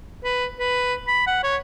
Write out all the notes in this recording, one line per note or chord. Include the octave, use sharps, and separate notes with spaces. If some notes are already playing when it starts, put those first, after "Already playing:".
B4
B4
B5
F#5
C#5